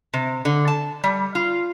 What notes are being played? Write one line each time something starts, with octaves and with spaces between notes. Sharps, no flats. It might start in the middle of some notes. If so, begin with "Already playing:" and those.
C3
D3
A5
G3
F4